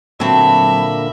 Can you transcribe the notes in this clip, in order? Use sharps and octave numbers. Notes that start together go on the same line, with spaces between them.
A#2 D3 F#3 A#3 C4 A4 E5 B5